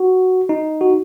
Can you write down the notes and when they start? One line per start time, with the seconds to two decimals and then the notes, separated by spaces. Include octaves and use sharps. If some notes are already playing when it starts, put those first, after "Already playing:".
Already playing: F#4
0.49 D#4
0.81 F#4